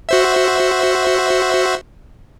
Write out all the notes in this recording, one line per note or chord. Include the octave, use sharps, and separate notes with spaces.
F#4 C5 E5